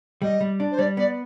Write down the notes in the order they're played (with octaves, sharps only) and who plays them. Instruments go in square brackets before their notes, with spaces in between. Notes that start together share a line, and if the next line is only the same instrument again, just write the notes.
[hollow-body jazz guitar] G3 [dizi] D#5
[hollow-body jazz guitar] G3
D4
[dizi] C5
[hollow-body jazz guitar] G3 [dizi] D5
[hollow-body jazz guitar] B3 [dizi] D5